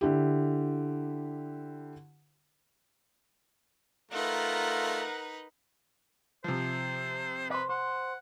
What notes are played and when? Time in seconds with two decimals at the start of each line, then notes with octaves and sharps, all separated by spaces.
0.01 D3 E4 G4
4.12 A3 D#4 F4 A#4 B4 F#5
6.44 C3 F3 C5
7.50 B4 C5 D5
7.69 C5 F#5